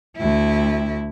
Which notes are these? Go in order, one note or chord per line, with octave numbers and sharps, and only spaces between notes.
D2 E4